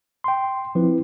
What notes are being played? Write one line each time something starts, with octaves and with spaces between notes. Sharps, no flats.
G5 C6
F3 C4 E4 B4